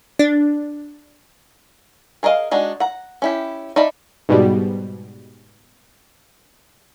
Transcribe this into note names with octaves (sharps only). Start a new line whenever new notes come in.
D4
G#4 A#4 D5 D#5 F5
G#3 D4 D#4 F#4
F#5 A#5
C#4 E4 G4
D#4 D5 E5 A5 B5
G#2 B2 G3